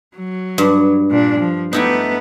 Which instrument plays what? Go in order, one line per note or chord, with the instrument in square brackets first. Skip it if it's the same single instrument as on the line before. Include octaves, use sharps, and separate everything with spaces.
[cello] F#3
[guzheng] G2
[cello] A#2 D4
F3
[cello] A3 B3 [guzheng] D#4 E4 G4